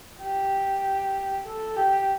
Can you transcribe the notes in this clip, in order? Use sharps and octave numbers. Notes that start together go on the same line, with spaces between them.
G4
A4
G4